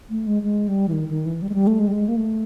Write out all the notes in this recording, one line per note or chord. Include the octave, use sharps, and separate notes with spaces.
A3
G#3
G#3
G3
E3
D#3
D#3
E3
G3
G#3
G3
A3
G#3
G3
G#3
A#3
A3